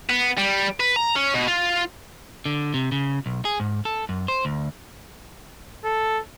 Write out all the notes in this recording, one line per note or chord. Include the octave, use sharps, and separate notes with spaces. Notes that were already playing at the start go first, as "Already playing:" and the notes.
B3
G3
B4
A#5
C#4
B2
F4
D3
C3
C#3
B1
G#4
G#2
A4
F#2
C5
D2
A4